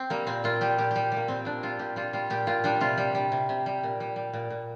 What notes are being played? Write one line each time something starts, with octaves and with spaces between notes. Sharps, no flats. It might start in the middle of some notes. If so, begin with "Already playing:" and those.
Already playing: C4
G3 A#3
A#2 C4
A#2 F4
G3 G4
A#2 G4
G3 G4
G3 A#3
A#2 C4
A#2 D4
G3 F4
A#2 G4
G3 F4
G3 F4
A#2 G4
A#2 F4
G3 D4
C3 F4
G3
G3
C3
C3
G3
A#2
G3
G3
A#2
A#2